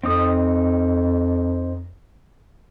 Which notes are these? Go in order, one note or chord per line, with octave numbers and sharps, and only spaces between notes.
F2 C4 D#4 D#6